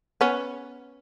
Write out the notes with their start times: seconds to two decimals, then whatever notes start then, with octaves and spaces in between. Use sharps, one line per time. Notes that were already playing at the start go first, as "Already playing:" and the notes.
0.21 B3 C#4